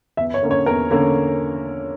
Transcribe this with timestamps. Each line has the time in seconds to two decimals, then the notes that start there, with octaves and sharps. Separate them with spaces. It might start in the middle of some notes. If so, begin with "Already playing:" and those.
0.17 E2 E5
0.34 C#5
0.43 D3 A#3 C#4
0.51 C#5
0.66 E2 A#4
0.91 D3 A#3 C#4